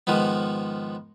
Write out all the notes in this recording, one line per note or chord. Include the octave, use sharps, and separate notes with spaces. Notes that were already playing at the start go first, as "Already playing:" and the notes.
G#2 D#3 F3 G#3 B3